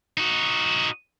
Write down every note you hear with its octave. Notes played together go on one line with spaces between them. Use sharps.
D#4 F#4